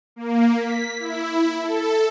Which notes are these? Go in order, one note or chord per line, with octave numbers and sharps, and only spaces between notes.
A#3
B6
E4
A4